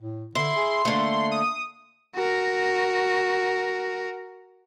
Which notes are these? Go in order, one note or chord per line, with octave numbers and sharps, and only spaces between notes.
A2
D3 E4 C6
G#4
D3 A3 A#3
D#6
F#4 A#4